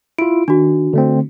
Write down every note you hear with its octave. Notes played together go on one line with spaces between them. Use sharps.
E4 F4 D7
D#3 D4 F#4
D3 A3 C4